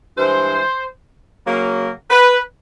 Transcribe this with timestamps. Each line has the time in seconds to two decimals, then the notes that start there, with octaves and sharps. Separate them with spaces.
0.17 G2 E3 G#3 C5
1.46 C#3 F#3 A#3
2.10 B4